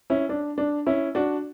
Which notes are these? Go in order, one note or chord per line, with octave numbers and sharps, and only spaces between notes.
C#4 E4
D4
D4
C#4 E4
D4 F#4